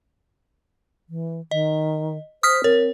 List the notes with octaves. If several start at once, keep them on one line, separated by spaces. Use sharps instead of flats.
E3
D#3 D#5
C5 D#6 F6 B6
C4 A#4 C#5